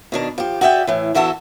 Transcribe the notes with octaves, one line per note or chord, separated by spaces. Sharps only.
B2 D#3 D4
F3 G4
F#4 G#4 D5 E5 F5 G5
A2 E3
E2 E3 F#4 A4 E5